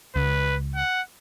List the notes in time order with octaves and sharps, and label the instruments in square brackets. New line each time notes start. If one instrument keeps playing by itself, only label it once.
[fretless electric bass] C#2 [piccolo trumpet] B4
[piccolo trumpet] F#5